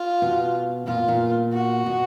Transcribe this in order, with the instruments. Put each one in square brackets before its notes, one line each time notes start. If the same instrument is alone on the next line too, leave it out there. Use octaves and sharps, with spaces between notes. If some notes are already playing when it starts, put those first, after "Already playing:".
Already playing: [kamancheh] F4
[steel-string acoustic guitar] B2
[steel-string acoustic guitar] A#2 [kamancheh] F4
[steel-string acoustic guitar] A#2
[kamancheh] F#4
[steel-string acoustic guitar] B2